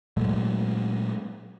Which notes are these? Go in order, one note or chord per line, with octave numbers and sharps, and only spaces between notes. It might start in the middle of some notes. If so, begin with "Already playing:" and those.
A#2 F#3 G#3 A3